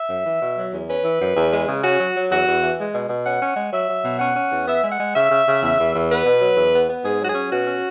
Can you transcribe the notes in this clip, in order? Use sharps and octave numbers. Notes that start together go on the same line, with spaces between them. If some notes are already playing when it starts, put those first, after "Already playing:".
Already playing: E5
F#2
E3
B2
F#3
E2
C#4 B4
E3
F#2
E2
G#3
C#3
C#4 F#4
F#3
F#3
E2 F#4
E2
E3
G#3
B2
B2
C#4 F#5
C#4
G#3
F#3 E5
F#3
B2
C#4 F#5
C#4
E2
B3 E5
G#3
F#5
G#3
C#3 E5
C#3
C#3
E2
E2
E2
B3 B4
B2
F#3
E2
B3
B3
G#2 G#4
F#3 F#4
G#4
C#4
B2 F#4
C#4